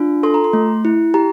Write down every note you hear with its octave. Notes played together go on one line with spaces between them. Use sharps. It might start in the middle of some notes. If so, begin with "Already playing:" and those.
Already playing: D4 F4
A4 C6
A#5
C6
A3
E4
G4 A#5